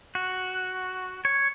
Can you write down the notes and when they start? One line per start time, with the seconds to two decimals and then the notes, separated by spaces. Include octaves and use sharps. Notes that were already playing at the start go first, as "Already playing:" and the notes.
0.15 F#4
1.25 C#5